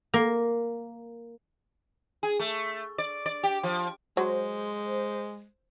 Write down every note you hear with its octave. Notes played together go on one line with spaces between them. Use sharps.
A#3
G#4
A3
D5
D5
G4
F3
F#3 G#3 C5